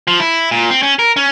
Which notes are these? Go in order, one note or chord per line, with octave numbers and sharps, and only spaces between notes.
F3
E4
A#2
C4
C#4
A#4
C#4